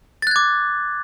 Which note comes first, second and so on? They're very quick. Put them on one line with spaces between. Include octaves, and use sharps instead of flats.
A6 F#6 G#6 D6